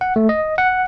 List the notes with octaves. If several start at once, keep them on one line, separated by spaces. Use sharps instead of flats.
F#5
A3
D#5
F#5